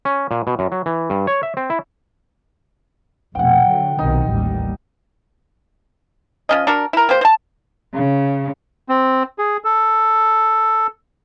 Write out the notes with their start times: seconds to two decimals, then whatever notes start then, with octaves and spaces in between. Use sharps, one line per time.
0.05 C#4
0.31 A#2
0.47 B2
0.59 F#2
0.72 F#3
0.86 E3
1.10 G2
1.27 C#5
1.43 E5
1.57 C4
1.70 E4
3.35 F1 B2 F#5 G5
3.67 D3 F#3
3.99 B1 C3 D#3 D#4
4.28 A1 D#2 G3
6.49 F3 C#4 D#5
6.67 D4 F#4 A#4
6.93 E4 A#4
7.09 A#3 G4 C5
7.21 C5 A5
7.94 C#3
8.89 C4
9.38 G#4
9.64 A4